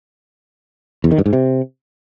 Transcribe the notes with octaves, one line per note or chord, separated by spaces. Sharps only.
E2
D#3
G2
G#2
C3